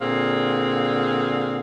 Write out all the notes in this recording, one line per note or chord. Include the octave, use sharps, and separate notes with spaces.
A#2 D3 C4 G#4 F5